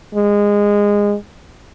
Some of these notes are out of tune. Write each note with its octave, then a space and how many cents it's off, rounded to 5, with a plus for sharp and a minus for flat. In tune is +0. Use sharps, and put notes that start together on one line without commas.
G#3 -20